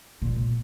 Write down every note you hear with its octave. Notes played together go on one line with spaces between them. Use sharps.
A#2